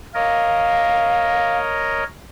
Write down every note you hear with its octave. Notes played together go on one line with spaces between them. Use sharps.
A#4 C#5 D#5 F5